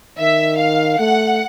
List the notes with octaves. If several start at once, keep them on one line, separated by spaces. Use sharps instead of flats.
D#3 E5
F5
A3 F#5